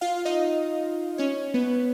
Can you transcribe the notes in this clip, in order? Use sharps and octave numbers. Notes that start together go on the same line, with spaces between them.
F4 F5
F5
D#4 D#5
C#4 C#5
B3 B4